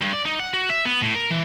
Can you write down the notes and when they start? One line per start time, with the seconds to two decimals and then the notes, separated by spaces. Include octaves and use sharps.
0.01 G2
0.13 D5
0.25 D#4
0.39 F#5
0.54 F#4
0.70 E5
0.85 B3
1.02 A2
1.15 A#4
1.30 E3